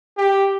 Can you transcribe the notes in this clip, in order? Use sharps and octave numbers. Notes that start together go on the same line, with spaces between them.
G4